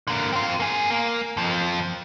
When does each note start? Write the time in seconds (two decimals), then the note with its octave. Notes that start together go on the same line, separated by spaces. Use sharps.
0.07 D3 A#3
0.32 C4 F4
0.60 A#3 G#4
0.91 A#3
1.37 F2 F3